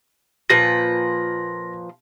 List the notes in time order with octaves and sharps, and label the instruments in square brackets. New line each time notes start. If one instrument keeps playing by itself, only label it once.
[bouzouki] A#2 F3 B4 [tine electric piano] A#6